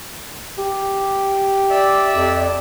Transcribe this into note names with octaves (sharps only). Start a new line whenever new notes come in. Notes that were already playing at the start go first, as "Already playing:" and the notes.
G4
D5 E5
F2